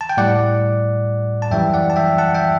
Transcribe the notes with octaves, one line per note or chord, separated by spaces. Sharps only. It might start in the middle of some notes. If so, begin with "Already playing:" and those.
A5
G5
A2 G3 D5 F#5
A5
F#2 E3 G3 E5 G5
D5 F#5
A5
E5 G5
F#5 A5
E5 G5